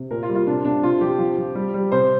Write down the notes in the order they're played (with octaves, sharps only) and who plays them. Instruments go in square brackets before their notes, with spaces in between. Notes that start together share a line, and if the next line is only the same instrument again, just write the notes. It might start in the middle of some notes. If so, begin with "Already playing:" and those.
Already playing: [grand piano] C3
A#2 A#4
F4
G3
F4
C3 D4
C3 D4
C3 F4
F3 G4
F3
F3
G3
G3
C3 C5